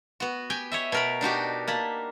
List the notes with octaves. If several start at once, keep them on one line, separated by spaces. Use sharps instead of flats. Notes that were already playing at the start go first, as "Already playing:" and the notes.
B3 F#4
G4 G5 G#5
C#5 D#5 E5
B2 A#4 B5
D4 D#4 F#4 G4
A#3 A5 B5